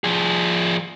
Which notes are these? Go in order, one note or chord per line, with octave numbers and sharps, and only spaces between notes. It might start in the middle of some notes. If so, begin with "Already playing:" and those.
F3 G#4